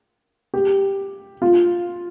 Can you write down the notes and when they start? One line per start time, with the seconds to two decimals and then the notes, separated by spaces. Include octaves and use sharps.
0.54 G4
1.42 F4